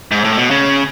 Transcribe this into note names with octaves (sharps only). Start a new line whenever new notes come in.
G#2
A2
B2
C#3